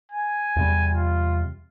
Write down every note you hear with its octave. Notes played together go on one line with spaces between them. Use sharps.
G#5
E2 C3 G3
F4